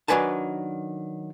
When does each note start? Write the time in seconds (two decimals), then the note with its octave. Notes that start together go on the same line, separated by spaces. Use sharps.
0.08 D#3 F#3 D4 B4 G#5 A5